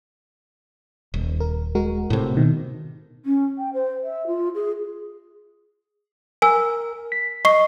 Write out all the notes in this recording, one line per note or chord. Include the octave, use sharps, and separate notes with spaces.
D#1
A#4
G#3 F#4 A#4
A2 C3
B2 D#3
C#4
G5
C5
E5
F4
G#4
A#4 G#5 E6
B6
D#5 C#6 C7